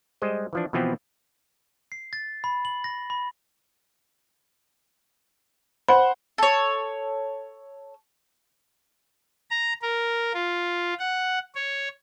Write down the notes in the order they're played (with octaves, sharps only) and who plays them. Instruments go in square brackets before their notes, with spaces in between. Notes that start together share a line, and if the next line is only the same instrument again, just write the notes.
[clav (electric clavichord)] G3 G#3 C5 D#5
E3 F3 D4
B2 E3 F3 B3 C4
[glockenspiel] C7
A6
B5
F#7
A#6
B5
[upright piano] C5 F#5 [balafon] B5
[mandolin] A4 C#5
[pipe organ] A#5
A#4
F4
F#5
C#5